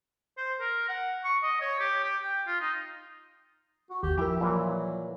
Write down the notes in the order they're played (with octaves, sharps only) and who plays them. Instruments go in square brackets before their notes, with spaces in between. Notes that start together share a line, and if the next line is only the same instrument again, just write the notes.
[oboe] C5
A#4
F#5
C#6
D#5
C#5
G4
G4
G5
F4
D#4
[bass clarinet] F#4
[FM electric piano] G1 D#2 [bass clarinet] G4
[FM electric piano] F3 A#4 [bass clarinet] E4 [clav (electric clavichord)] G4 E5
[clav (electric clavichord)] A#2 E3 [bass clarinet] F#3